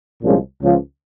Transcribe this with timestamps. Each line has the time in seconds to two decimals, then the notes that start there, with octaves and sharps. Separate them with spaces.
0.22 C2 A#2 F3 G#3 C#4
0.60 C#2 C#3 F3